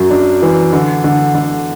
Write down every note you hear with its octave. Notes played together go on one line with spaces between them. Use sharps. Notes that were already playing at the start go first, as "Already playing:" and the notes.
Already playing: F#2 F#3
D4
E3
D3
D3
D3